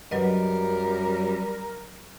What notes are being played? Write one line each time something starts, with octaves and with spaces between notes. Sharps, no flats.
F#2 F#3 G3 A#4 B4 D#5